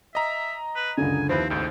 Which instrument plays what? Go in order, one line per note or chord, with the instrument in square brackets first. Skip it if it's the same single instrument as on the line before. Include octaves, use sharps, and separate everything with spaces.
[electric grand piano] D#5 A#5 [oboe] E5
[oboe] B4
[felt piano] C#2 F#2 D3 [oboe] G#5
[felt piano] D#2 C5 [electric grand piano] F3 E4 B4 [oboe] C4
[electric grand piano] G#1 C#2 A2 [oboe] G5